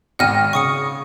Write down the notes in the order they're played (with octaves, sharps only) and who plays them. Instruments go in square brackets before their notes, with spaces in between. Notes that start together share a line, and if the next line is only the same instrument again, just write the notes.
[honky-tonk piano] G#1 G5 A#6 [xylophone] F#5 F6 D#7
[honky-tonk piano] C#3 [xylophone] C#6 D#6 C#7